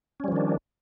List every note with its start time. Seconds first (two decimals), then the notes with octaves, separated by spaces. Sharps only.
0.20 C#4
0.24 G3
0.28 F3
0.32 D#3
0.36 D4